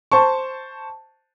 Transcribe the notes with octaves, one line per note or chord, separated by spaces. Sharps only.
C5 A5 C#6